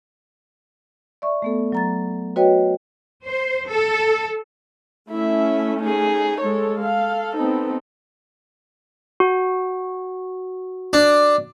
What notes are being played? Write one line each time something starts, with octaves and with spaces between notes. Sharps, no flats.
D5 E5 C#6
A3 B3 A4
F#3 A#5 A6
F#4 B4 C#5 D#5 G5
C5
A4
A3 C#4 E4 E5
D#4 G#4
G#3 A4 C#5
A4 F5
B3 C4 D#4
F#4
D4